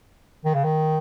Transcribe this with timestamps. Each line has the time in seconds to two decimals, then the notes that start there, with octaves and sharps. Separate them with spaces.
0.45 D#3
0.54 C#3
0.64 D#3